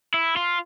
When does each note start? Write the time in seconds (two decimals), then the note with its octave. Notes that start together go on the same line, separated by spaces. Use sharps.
0.14 E4
0.36 F4